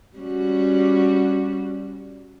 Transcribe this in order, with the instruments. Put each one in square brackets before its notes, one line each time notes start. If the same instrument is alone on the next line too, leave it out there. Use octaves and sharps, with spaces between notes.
[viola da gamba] G3 C#4 F#4